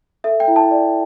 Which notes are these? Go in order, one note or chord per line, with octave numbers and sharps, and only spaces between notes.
A4 E5
G5
E4
A5
D5